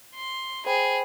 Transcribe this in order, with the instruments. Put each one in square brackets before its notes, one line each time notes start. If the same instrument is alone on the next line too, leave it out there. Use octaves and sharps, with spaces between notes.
[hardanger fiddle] C6
[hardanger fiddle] G#4 [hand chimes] C5 G5 B5